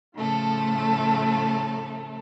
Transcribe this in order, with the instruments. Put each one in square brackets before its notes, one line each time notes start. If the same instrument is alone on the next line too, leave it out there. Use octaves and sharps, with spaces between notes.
[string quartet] A2 C#3 F3 A3 A4